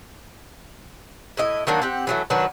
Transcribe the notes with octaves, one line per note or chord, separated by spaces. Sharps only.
A2 E4 D#5
D#3 F#3 A#3 D4
C4 G4 F#5
E3 F#3 A3
D#3 F#3 D4 B4